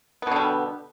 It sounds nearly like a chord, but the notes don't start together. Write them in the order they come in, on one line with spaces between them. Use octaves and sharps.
B3 B2 D3 G3